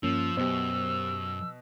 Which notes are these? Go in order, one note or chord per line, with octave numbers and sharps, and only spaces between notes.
G2 F3 A#3 C#4 E6
F#2 B2 G4 C5